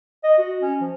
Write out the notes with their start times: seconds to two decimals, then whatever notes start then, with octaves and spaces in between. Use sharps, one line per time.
0.24 D#5
0.38 F#4
0.62 C#4
0.81 F3